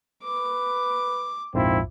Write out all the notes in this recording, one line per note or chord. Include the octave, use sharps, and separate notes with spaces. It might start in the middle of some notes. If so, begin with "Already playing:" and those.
B4 D6
A#1 F2 G#2 F3 C4 E4